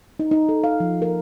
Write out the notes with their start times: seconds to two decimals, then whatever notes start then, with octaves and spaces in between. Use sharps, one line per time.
0.19 D#4
0.31 D#4
0.49 A4
0.64 F5
0.80 F3
1.02 A#4